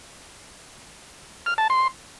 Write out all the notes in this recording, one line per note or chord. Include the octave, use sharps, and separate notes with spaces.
F6
A5
C6